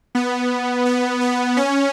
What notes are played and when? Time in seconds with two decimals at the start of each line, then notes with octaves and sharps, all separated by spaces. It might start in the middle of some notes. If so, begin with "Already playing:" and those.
0.15 B3
0.86 B3
1.21 B3
1.57 C#4